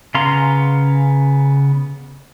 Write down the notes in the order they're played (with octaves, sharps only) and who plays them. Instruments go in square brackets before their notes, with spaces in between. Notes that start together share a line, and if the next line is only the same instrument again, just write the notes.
[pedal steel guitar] C#3 B3 F5 A#5 C6